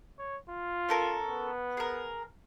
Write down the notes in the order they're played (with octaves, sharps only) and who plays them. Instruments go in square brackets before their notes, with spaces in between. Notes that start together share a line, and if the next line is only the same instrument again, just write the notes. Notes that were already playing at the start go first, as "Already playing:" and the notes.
[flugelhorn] C#5
F4
[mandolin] C#4 A4 A#4
[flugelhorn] B3
[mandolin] G#4 A#4